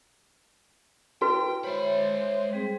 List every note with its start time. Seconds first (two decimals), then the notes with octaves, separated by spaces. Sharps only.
1.22 E4 F#4 B4 G5
1.64 G#3 C5 C#5 E5 B5
2.53 G3 C4 G#4